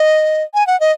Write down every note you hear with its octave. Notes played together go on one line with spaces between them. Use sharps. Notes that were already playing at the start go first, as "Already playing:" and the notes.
Already playing: D#5
G#5
F#5
D#5